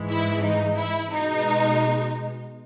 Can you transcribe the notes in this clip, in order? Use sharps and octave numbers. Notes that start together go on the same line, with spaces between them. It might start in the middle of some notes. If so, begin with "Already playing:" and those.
Already playing: G#2 E3 G#3
E4
D#4
E4
B2 G#3 D#4